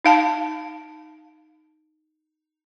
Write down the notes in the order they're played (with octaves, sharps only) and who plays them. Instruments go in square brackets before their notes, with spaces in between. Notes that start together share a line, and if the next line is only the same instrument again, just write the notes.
[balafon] D#4 F5 A5